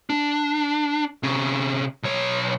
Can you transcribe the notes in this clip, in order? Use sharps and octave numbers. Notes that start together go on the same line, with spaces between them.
D4
C3 C#4
B1 C#5